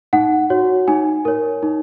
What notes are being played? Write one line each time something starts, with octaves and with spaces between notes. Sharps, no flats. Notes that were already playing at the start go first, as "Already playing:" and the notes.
D#4 F#5
F#4 C#5
D#4 G#5
A#4 C#5
D#4